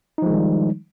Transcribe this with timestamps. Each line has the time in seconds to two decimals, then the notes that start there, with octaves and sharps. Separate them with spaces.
0.18 D#4
0.22 F3
0.26 G#3
0.30 D#3
0.34 G3